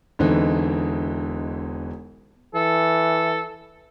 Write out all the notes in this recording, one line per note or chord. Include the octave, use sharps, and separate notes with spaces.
E1 D3 E3 C4 D#4
E3 A4